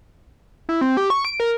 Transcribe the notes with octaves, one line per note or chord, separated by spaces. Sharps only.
E4
C4
G4
C#6
D7
A#4